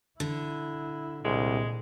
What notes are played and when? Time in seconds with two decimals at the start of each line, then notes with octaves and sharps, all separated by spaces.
0.20 D3 E4
1.25 C2 A#2 G#3